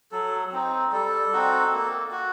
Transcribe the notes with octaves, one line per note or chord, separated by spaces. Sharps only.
F#3 A4
C4 D#4
G3 A4
C4 D#4 F#4
A#3
F#4